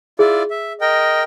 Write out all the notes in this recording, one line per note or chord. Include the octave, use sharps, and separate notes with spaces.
E4 F4 G#4 D5
E5
A#4 D#5 G5